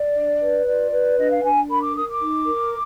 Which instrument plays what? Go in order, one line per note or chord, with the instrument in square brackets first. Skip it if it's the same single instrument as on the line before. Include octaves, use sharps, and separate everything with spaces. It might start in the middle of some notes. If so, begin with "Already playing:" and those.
Already playing: [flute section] D5
D4
B4
F4 D5
B4
D4 D#5
F5
D4 G#5
A#4 B5
D6
A#4 D#6
D6
D#4
A#4